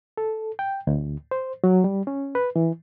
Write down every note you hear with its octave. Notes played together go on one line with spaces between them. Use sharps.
A4
G5
D2
C5
F#3
G3
C#4
B4
E3